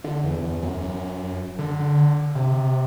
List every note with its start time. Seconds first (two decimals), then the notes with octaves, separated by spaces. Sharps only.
0.04 D3
0.24 E2
0.43 E2
0.62 F#2
0.81 F#2
1.59 D3
2.35 C3